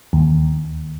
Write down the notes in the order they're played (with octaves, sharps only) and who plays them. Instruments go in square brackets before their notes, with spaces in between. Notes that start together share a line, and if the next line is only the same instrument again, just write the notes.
[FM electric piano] D#2